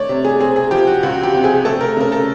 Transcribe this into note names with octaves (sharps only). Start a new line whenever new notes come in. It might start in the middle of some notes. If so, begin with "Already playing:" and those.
Already playing: A3 C#5 D5
C3
G#4
C4 G#4
G#4
F3 G4
F#4
C#2 F#4
G4
C3
G#4
A3 A4
A#4
C#3 A#4
A4